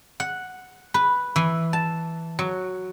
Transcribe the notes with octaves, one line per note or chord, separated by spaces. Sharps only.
F#5
B4
E3
A5
F#3